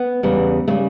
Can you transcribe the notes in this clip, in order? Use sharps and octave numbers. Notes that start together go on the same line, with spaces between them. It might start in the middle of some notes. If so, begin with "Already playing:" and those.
Already playing: B3
E2 C#3 G3
C#3 G3 A3